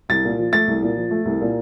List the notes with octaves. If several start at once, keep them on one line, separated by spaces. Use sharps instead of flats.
C2 A6
A#2
F3
A3 A6
C2
A#2
F3
A3
C2
A#2